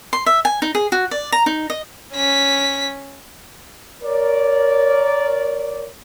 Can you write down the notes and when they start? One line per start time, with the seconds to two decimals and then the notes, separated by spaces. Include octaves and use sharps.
0.13 C6
0.26 E5
0.45 G#5
0.62 D#4
0.75 G#4
0.92 F#4
1.11 D5
1.32 A#5
1.46 D#4
1.70 D#5
2.14 C#4 B6
4.03 A#4 C#5 D5